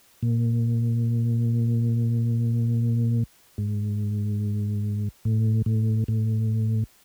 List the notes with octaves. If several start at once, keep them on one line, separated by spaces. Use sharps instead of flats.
A#2
G#2
A2
A2
A2